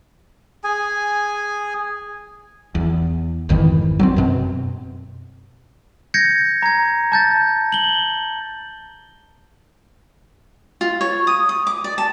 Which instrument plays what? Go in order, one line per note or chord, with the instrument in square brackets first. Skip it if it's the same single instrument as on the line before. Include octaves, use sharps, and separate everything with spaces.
[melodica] G#4 G#5
[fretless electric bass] E2
G#1 F2 D#3 E3
F#3 A#3 C4
F#2 B2 C4
[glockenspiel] G6 G#6 A#6 C#7
A#5 G#6
A5 G6 A6
F#7 G7
[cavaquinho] F4
C#5
D#6
D#6
D6
D5
A5